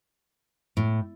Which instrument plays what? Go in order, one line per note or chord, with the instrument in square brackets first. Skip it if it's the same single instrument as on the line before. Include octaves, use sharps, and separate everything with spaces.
[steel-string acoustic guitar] A2